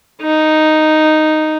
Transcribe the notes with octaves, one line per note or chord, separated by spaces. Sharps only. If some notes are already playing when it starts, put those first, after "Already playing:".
D#4